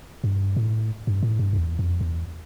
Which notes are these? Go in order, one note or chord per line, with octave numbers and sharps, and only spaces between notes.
G2
A2
G2
A2
G2
F2
E2
F2
E2